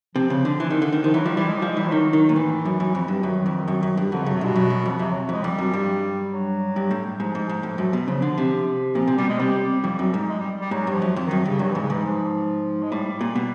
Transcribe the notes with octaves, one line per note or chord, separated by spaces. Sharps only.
C3 F3
C#3
D3
E3
D#3
D3
D#3
D#3 F3
E3 F#3
F3 G3
E3 G3
G#3
F3 G3
G#3
E3 G3
F3
D#3 F#3
D#3
A#2
A2 E3
F#2
F#2
F2
G2
F#2 D#3
F2
F#2
F#2
G2
F2 D3
F#2 C#3
C3
G2 B2
F#2
F#2
F2
F2 C3
F#3
F2 G#3
F2 G3
F#2
G2
F#3
G2
A2
G#2 F3
G#2
G#2
A2
F#2
B2
C#3 F3
D3
C3
A#2 F3
C3
B2 G3
G#3
C3 G3
F2
F#2
G#2
G#3
G3
G3
G#2 F#3
G2
F3
F#2
F2
F#2 D#3
G2 C#3
G2 F#3
G#2 E3
C#3
G#2 E3
F3
G#3
A2 G3
A#2
B2